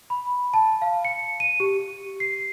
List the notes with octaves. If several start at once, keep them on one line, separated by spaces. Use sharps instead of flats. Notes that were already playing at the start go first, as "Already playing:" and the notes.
B5
A5
F5
C#7
D#7
G4
C7